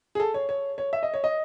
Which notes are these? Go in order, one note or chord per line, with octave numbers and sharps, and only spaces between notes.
G#4
A4
C#5
C#5
C#5
E5
D#5
C#5
D#5